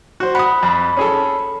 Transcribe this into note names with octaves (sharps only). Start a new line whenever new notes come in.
F#4 C5
F#5 B5 D#6
F2
C#4 G#4 A4